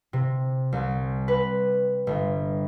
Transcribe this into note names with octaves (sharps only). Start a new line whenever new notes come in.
C3
C2
B4
G1